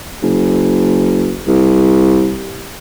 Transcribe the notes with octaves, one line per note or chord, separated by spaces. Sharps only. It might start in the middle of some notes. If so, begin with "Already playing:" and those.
F#1
C2